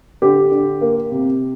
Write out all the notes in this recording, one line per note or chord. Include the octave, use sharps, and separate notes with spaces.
D3 G4
D3
A#3
C3